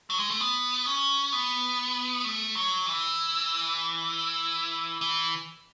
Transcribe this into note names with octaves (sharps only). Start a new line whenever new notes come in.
F#3
G#3
A3
B3
C#4
B3
A3
F#3
E3
E3